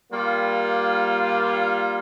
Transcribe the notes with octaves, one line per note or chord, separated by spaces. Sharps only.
G3 A#3 F4